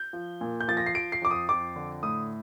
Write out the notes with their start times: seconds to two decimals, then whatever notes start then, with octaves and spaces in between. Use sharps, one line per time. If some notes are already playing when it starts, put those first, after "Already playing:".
Already playing: G6
0.13 F3
0.41 A#2
0.61 G6
0.68 F3 A6
0.77 A#6
0.86 C7
0.95 F3 D7
1.12 C7
1.22 F2 D6
1.31 D#6
1.49 F2 D6
1.76 D3
2.03 A2 D#6